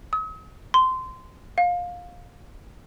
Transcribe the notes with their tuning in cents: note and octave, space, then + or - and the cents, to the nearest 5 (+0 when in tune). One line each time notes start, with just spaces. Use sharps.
D#6 +45
C6 -15
F5 +20